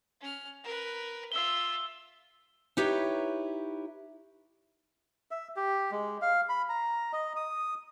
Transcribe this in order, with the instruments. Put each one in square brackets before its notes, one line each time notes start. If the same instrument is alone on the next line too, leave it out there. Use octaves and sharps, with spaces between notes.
[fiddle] C#4 F6
A#4 B4
[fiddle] F4 E5 [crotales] E6 G7
[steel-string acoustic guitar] D#4 E4 G4 B4 C#5
[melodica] E5
G4
G#3
F5
B5
A#5
D#5
D#6